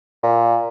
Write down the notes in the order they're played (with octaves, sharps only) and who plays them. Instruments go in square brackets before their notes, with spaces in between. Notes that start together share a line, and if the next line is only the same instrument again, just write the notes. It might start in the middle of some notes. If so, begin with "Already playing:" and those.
[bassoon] A#2